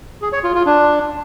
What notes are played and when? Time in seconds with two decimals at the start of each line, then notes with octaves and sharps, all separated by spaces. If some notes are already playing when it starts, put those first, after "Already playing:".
0.22 G#4
0.33 C#5
0.44 F4
0.55 F4
0.66 D4